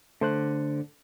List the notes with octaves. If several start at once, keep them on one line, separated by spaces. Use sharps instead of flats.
D3 A3 C5 F#6